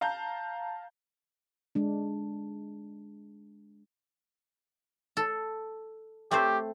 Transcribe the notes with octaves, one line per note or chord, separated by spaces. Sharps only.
F5 A5 A#5 G6
G#3 D4
A4
A3 C4 G4 C5